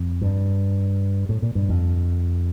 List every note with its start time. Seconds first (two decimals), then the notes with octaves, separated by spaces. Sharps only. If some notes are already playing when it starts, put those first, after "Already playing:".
Already playing: F2
0.22 G2
1.29 A2
1.42 A#2
1.55 G2
1.69 F2